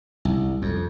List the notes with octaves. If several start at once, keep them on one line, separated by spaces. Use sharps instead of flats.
C2
F2